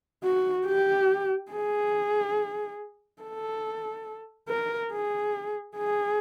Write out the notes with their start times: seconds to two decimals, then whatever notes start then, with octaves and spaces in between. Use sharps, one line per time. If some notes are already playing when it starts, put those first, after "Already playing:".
0.24 F#4
0.66 G4
1.52 G#4
3.22 A4
4.49 A#4
4.92 G#4
5.77 G#4